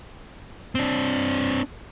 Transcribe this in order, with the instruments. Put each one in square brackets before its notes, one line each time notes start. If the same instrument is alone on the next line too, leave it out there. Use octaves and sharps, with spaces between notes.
[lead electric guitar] C4 D4